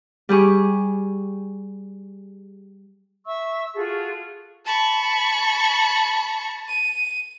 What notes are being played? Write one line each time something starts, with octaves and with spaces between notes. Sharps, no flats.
G3 G4 G#4 C#6
E5 C#6 E6
F4 F#4 G#4 A4
A5 B5 C#6
D#7